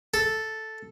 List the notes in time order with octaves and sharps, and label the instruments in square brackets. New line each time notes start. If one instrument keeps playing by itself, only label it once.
[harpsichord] A4